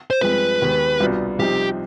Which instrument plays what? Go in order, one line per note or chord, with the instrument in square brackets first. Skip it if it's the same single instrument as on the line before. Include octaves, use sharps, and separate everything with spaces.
[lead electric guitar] C5
[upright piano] G2 F3 G#3 C4 [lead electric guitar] B4
[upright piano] D#2 D#3 G#3 B3
C2 B2 B3 D4 F4
[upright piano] C2 C3 F3 C4 D#4 [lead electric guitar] G4